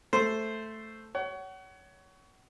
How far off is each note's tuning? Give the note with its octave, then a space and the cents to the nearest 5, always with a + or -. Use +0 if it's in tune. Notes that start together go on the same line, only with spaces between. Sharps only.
A3 +0 C5 +0
C#5 +20 F#5 +35